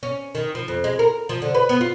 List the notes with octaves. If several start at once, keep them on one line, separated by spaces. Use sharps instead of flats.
C#4
D#3
F3
F2
G#3
A#4
F3
D3
B4
B3
F4